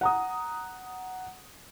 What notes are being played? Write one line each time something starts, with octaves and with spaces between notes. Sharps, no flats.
F#5 A#5 D#6